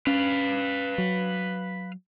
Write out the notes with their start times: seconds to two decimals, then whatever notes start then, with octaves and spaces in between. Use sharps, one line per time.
0.07 C#4 B4 F5
0.98 F#3